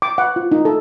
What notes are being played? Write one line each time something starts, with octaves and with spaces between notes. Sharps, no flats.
D6
F#5
F4
D#4
A4